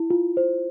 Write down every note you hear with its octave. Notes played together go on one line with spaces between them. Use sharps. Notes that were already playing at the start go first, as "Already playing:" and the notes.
Already playing: E4
F4
C5